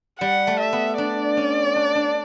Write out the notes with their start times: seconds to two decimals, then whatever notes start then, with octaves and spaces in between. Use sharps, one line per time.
0.20 G3 F#5
0.47 A3
0.60 E5
0.73 B3
0.98 D4 D5
1.37 C#4
1.76 D4
1.95 D4